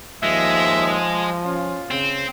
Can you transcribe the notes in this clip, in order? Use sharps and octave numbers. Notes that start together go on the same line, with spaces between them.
D#2 F3 G#3 E5
C#4 F4
C#3 C4